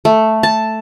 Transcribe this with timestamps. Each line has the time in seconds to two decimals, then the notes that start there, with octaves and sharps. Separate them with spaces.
0.05 A3
0.43 A5